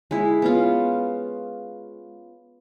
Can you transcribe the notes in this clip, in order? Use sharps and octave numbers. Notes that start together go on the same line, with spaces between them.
G#3 E4
B3 C#4 F4